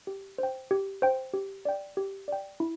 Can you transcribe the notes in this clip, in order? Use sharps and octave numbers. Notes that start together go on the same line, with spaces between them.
G4
C5 G5
G4
C5 G5
G4
D5 G5
G4
D5 G5
E4